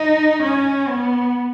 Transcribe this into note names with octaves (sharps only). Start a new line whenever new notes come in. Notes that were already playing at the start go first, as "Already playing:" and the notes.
Already playing: D#4
C#4
B3